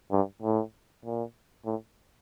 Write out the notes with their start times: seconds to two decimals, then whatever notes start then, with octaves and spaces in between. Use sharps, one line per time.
0.12 G2
0.43 A2
1.05 A#2
1.66 A2